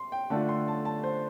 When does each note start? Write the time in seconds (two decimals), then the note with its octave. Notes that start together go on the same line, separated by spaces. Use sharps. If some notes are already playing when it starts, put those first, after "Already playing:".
Already playing: C6
0.12 G5
0.30 D3 A3 D4 F4 A5
0.49 C6
0.68 A5
0.85 A5
1.04 C5